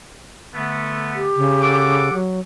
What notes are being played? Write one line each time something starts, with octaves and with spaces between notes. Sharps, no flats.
D3 A3 B3
G4
C#3
A4 F#5 D6
F#3